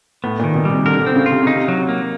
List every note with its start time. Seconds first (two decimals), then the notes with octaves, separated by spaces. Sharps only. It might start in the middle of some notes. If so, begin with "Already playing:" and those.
0.24 A2 B3
0.39 A#2 D#3
0.54 B2
0.65 C3 G3
0.86 D3 A#4
1.01 D3
1.07 C4
1.16 C#3
1.26 F4
1.31 C3
1.43 C#3 D#4
1.55 C3
1.68 F#3
1.89 A#3